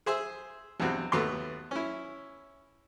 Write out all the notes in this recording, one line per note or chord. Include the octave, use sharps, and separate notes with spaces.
G#4 C5 E5
E2 G2 B2 C4 F#5
D#2 A3 B3 F#4 C6
C#4 E4